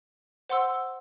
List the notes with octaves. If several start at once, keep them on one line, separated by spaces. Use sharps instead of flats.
C5 F#5 C6 E6